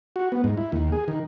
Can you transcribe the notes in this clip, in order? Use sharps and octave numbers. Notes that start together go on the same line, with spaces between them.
F#4
B3
G#2
E4
D#2
G#4
D#3